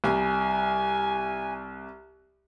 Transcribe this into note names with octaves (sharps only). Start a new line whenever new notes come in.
C2 G#5